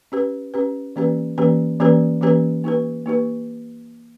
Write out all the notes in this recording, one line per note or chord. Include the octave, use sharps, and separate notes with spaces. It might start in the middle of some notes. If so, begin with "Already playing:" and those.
C#4 G4 B4
C#4 G4 B4
E3 A#3 C#4 G4 B4
E3 A#3 C#4 G4 B4
E3 A#3 C#4 G4 B4
E3 A#3 C#4 G4 B4
A#3 D#4 G4 B4
A#3 D#4 G4 B4